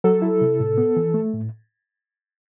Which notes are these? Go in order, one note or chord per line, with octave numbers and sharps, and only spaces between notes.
F#3 A4
E4
C3
A2
B3
E3
A3
A2